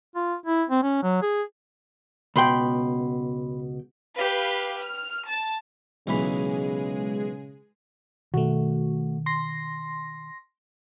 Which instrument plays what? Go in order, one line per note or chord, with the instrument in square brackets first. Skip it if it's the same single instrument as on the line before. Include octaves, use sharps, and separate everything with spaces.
[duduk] F4
E4
C4
C#4
F#3
G#4
[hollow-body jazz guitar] C#2 B2 G5 [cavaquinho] B5 C6
[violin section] G4 B4 F5
F6
A5
[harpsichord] B1 E3 B5 [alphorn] C#3 [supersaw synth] G#3 G#4
[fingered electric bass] B2 D#3 [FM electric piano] A3 F#4
[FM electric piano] C6 A#6